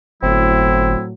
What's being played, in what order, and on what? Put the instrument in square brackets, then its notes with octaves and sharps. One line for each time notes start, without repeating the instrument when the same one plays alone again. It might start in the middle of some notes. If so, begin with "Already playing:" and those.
[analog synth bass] G1 [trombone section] A2 F#3 [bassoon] C4 [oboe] E4